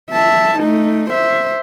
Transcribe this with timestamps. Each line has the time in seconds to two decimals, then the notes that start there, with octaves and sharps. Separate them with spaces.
0.11 E5 A5
0.59 A3 D#4
1.10 C5 E5